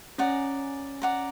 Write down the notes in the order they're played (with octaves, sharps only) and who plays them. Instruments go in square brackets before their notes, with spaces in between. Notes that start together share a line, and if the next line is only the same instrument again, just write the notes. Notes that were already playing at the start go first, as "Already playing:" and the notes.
[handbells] C#4 [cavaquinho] D5 F#5 A#5
[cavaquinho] D5 F#5 A#5